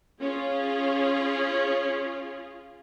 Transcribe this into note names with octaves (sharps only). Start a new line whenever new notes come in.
C#4 F4 G#4